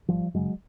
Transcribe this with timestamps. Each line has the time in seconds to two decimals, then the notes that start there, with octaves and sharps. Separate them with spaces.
0.08 G#1 F3 G3
0.34 F#2 C#3 F#3 G#3